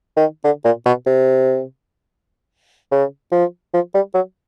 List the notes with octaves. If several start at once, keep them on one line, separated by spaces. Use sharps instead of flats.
D#3
D3
A#2
B2
C3
C#3
F3
F3
G3
F#3